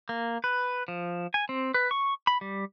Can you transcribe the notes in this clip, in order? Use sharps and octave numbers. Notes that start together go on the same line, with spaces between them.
A#3
B4
F3
G#5
C4
B4
C#6
B5
G3